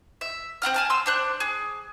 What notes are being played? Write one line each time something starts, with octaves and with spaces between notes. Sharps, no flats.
E5
C4 F4 F#5 F6
G#5 A5 F6
C6 E6
D4 C5 F#6
G#4